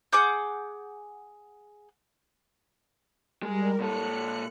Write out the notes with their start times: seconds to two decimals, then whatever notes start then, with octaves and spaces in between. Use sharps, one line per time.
0.13 G#4 F#5 D6 G6
3.43 G3 G#3 G#4 A#4
3.80 A#2 A4 F#6 C#7